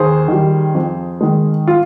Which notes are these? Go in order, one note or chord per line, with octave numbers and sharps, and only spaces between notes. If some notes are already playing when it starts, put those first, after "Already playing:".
Already playing: D#2 G#4 C5
D#3 G3
F2
D#3 G#3
F4